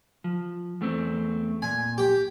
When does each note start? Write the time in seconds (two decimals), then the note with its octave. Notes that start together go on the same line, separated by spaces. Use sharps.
0.24 F3
0.81 E2 A3 C4
1.62 A#2 G#5
1.98 G4